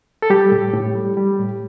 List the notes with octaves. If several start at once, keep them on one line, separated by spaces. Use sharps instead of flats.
A4
G3 G4
A2
A2
G3
G3
A2